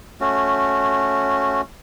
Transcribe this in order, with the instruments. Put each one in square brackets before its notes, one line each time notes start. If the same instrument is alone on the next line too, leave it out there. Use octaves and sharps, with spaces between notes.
[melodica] A3 C#4 F#4